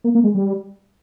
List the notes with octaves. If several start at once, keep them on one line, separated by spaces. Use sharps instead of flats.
A#3
A#3
G#3
G3